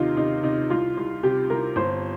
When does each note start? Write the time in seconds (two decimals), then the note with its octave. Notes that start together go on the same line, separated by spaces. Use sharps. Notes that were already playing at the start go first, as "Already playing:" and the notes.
Already playing: D#2 C3 D#3 D#4 F4
0.16 C3 D#4
0.43 C3 D#4
0.70 C2 F4
0.97 C2
1.23 C3 G4
1.50 C2 A#4
1.76 G1 C5